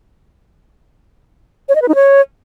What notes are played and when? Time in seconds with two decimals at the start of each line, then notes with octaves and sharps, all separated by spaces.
1.69 C#5
1.75 D#5
1.82 B4
1.88 D#4
1.95 C#5